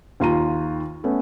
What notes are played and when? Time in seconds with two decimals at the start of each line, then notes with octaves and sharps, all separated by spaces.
0.20 D#2 F4 A#5 D#7
1.04 A3 B3 C#4